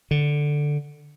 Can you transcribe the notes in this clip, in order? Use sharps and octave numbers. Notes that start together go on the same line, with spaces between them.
D3